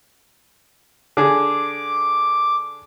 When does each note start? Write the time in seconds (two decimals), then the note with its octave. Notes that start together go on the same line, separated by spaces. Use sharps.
1.17 D3 G#4 D6